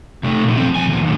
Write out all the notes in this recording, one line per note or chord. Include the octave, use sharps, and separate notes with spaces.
C3 A3
A#2 F3
F3 C4
C2 G#5
D2 A#2
D#2 A2